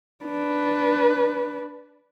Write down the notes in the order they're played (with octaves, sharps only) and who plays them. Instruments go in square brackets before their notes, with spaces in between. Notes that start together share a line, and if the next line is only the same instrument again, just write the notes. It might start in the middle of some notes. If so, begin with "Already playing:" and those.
[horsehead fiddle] D4 B4